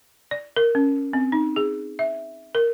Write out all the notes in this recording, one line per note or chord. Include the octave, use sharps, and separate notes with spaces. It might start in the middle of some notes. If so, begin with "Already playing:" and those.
D5
A#4
C#4
C4
D#4
G#4
E5
A#4